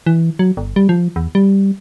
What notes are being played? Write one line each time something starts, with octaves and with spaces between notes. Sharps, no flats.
E3
F#3
G1
G3
F3
E2
G3